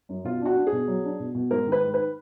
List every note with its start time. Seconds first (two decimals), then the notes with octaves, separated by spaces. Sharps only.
0.09 F#2
0.24 B2 F4
0.41 D4 F#4
0.56 D4
0.67 G#4
0.72 B2
0.88 F#3
1.04 D4
1.20 B2
1.35 B2
1.51 G#2 A#4
1.67 D#3
1.72 B4
1.83 G#2
1.94 B4